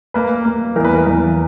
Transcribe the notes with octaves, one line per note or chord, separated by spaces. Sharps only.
A#3 B4
A#3
E2 A#4
B4
A#4
E2